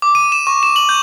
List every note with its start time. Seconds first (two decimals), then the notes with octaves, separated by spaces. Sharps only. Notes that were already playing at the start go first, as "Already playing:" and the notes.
0.02 D6
0.15 D#7
0.32 E7
0.47 C#6
0.63 E7
0.76 F#7
0.89 G6